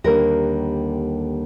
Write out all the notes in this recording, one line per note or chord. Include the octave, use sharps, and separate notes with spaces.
D#2 D3 G3 A#3 A#4